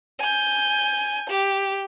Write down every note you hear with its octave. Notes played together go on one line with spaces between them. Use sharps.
G#5 G6
G4